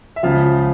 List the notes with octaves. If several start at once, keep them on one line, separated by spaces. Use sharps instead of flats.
E5
C#2 C#3 F3 F4 F5